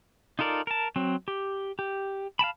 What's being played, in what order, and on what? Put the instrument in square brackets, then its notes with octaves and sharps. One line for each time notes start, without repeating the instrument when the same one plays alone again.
[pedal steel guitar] D#4 F4 A4 A#4 D5
A#4 A5
F#3 C4
G4
G4
F5 G5 A5 B5